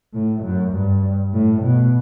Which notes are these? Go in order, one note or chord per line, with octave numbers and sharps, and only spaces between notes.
A2
F#2
G2
A2
B2